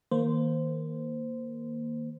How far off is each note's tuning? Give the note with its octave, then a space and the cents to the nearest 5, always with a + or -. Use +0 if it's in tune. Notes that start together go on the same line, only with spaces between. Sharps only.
D#3 +20 A#3 +0 C5 -15